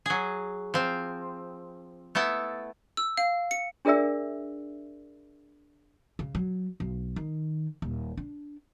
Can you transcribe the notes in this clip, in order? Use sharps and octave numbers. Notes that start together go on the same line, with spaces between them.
F#3 G#4
F3 C4
A3 B3 E4 A5
E6
F5
C#7
D4 G#4 A#4 D5 E5 E6
C#3
F#3
B1
D#3
D#1
D4